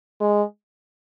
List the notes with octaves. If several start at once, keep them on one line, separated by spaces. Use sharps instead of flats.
G#3